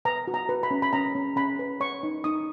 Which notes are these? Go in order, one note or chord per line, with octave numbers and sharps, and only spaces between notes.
B4 A#5
F#4
A#5
B4
B5
C#4
B5
C#4 A#5
C#4
C#4 B5
B4
C#5 C#6
D#4
D#4 D#6